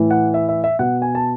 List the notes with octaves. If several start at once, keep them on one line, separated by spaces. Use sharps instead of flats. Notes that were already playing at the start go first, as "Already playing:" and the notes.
Already playing: A2 E3
F#5
E5
E5
E5
B2 F#5
G#5
A5